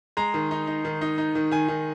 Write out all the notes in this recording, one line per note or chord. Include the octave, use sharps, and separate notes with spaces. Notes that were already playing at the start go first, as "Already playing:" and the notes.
G#3 A#5
D#3
D#4
D#4
D#3
D#4
D#4
D#3
D#3 G#5
D#3